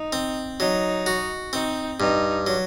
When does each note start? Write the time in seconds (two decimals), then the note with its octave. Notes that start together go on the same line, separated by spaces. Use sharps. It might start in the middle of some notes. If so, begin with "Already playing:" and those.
Already playing: D#4
0.13 C4
0.60 F#3 D#4
1.06 F#4
1.53 C4 D#4
2.00 G2 D#4
2.47 F#3